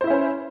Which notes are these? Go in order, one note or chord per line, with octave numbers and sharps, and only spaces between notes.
C#4 E4 B4 C5 E5